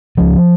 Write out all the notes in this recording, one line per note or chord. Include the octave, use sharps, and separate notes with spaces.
C#2 C#3 F3